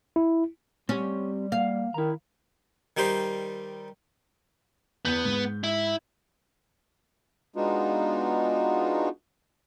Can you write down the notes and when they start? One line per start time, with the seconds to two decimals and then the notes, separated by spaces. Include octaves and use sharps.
0.16 E4
0.89 G3 C4 C#4 G4
1.52 A#3 F5
1.94 D#3 E4 A#5
2.97 D#3 G3 D#4 G4 C5
5.05 E2 B3 G6
5.25 G#2
5.64 E4
7.56 G#3 B3 D4 D#4 F4 F#4